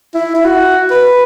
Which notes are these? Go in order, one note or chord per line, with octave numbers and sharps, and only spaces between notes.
E4
E4
F#4
B4